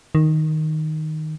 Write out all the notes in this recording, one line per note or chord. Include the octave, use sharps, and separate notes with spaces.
D#3